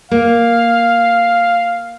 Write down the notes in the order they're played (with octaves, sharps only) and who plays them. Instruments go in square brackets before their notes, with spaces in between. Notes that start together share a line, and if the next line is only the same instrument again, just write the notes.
[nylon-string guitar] A#3 [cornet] F5